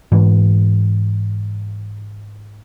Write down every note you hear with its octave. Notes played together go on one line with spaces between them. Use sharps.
G#2 E3